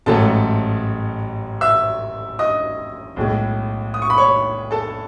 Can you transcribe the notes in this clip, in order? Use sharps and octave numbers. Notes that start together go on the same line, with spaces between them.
A1 G#2 F#3 A3 A4 A5
E5 E6
D#5 D#6
B1 A2 G#3
D#6
C#6
B5
C#5 C#6
A4 A5